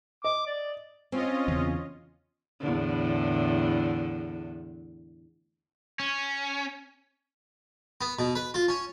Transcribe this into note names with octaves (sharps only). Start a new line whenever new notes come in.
D#5 D6
D5
C4 C#4 F4 D#5
E2 C#3
E2 A2 D3
C#4
B3
B2
B4
F4
C#4